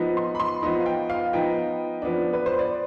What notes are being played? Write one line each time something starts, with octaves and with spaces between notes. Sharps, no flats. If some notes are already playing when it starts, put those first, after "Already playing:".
Already playing: F3 B3 D#4
C6
B5
C6
F3 B3 D#4
F5
G5
F5
F3 B3 D#4 G5
F3 B3 D4
B4
C5
D5